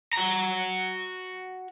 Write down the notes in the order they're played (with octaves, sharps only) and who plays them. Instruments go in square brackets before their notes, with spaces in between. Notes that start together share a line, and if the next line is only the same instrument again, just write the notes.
[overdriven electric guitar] F#4 A#5